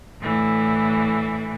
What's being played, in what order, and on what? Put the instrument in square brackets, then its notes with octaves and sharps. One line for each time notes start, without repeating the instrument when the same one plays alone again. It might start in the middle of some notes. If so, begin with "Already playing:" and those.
[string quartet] A2 D3 E3